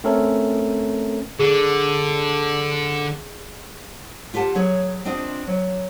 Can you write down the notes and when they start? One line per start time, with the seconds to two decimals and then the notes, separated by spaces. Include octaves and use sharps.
0.04 A3 C4 C#4 A4 A#4
1.39 D3 G#4
4.34 F4 G4 F#5 G#5 A5
4.55 F#3 G#4 C#5
5.05 C4 D4 F4 D#5
5.47 F#3